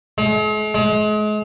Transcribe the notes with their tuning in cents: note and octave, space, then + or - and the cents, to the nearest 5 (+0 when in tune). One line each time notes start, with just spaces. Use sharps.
G#3 +45
G#3 +35